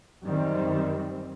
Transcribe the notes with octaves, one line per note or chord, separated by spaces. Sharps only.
F#2 D#3 G3 C4